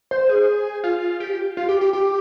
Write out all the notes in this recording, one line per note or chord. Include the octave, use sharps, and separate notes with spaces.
C5
G#4
F4
G4
F4
G4
G4
G4